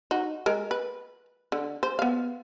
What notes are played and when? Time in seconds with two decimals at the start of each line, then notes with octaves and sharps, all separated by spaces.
0.11 D#4 F#4
0.46 G#3 A#4
0.71 B4
1.52 D3
1.83 C5
1.99 B3 F5